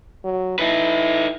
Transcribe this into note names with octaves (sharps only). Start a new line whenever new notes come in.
F#3
D#4 E4 B4